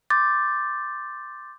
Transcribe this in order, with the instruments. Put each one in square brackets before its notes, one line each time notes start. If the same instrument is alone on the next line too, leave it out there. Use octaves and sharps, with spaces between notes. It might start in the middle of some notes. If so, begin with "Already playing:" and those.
[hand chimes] C6 D6 G6 A6